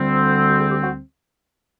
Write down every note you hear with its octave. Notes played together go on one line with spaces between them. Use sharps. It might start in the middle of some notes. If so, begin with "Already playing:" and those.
Already playing: D2 D3 G3 C4
F#4
G#4
G4
F#4